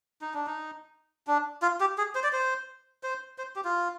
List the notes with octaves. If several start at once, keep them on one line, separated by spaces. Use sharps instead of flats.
D#4
D4
D#4
D4
F4
G4
G#4
C5
D5
C5
C5
C5
G4
F4